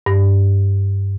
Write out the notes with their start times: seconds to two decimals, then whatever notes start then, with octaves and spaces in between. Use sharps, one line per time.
0.06 G2